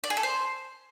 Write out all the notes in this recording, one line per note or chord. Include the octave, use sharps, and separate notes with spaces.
D5
G#4
A4
C5